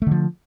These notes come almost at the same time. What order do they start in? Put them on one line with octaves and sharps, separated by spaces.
A3 D3 F3